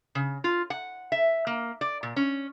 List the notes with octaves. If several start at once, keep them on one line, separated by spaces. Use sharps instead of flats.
C#3
F4
F#5
E5
A#3
D5
A#2
C#4